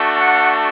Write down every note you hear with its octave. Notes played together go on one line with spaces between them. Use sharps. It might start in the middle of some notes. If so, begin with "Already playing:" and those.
Already playing: A3 D4 F#4
F#5